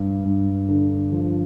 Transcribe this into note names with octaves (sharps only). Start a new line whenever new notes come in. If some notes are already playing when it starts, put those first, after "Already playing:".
Already playing: G2
G2
D3
F3